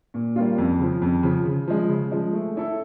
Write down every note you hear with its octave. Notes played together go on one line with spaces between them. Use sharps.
A#2
G3 A#3 C#4 F4
F2
C#3 F3
F2
C#3 F3
C#3
F3 G#3
C#3
F3 G#3
A3
C#4 E4 A4